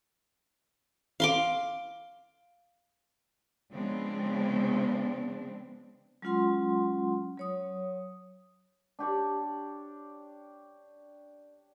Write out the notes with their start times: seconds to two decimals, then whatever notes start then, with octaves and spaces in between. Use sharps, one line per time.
1.20 F5 C6 D6
3.72 C#3 F3 G#3 B3 C4 D4
6.22 F#3 G#3 C#4 F4 F#5 C6
7.37 F#3 C#5 D#6
8.99 D4 G4 C#5 D5